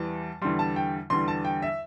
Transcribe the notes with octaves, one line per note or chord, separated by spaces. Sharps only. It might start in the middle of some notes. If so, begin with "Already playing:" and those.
Already playing: E2 E3 G3 A5
E2 D3 G3 C6
A5
G5
E2 D3 G3 C6
A5
G5
E5